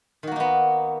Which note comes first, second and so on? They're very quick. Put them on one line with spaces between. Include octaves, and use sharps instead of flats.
D#3 F#4 A#3 D#4 B3